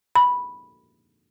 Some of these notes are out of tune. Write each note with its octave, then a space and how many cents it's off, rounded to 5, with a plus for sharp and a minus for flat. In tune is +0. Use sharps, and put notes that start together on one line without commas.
B5 -5